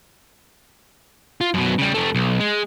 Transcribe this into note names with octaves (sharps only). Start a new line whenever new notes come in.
F4
F#2 B2
C#3 G3
F2 A3
B1
G#3